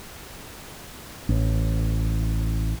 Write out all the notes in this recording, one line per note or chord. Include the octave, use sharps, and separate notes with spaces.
A1